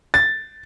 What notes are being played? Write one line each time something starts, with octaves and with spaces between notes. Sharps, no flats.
A6